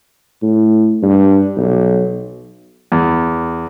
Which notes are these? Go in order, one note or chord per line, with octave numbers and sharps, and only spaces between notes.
A2
G2
B1
E2